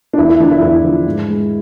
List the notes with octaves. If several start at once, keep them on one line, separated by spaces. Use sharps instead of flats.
D4
E2 E4
E4
D3 F3 D4
E4
E2 E4
D3 F3
G#2
G#3